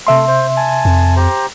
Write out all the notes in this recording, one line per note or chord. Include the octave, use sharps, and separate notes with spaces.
C3 A3 E5 C6
C5
G#5 A5
F2
G4 C5 A#5